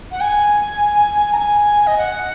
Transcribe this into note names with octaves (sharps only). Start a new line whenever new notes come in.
F#5
G#5
A#5
G#5
D#5
F#5